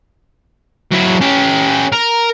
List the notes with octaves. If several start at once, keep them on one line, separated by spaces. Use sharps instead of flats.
F#3 E4
C#4 G4
A#4